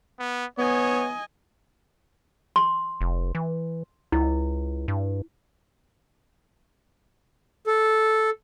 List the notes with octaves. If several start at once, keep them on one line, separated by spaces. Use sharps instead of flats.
B3
B3 C#5 D#5 G#5
C6
F1
E3
C#2 E4
G2
A4